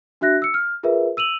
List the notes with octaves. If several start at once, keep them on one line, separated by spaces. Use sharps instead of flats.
D4 F#4 E5 F#6 A#6
E6 C#7
F6
F4 G#4 A#4 B4 E5
E6 D#7 F7 F#7